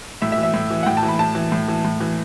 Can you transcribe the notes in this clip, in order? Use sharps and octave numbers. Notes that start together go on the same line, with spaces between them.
A2 E5
E5
E3
E5
A2
E3
F#5
A2 G5
A5
E3
B5
A2 A5
E3
A2
E3
A2
E3